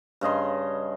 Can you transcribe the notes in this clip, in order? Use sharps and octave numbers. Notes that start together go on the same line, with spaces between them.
G2 C#3 D#5 C6